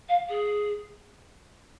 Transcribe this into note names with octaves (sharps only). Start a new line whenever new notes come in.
F5
G#4